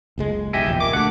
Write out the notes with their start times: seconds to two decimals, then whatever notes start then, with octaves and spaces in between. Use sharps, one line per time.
0.18 F#1 C#2 G#3
0.53 F#1 B1 G4 D#5 E5 G#5
0.66 A#1 E2 A#2
0.80 A#2 A#3 D6
0.93 D2 A3 F#5 D6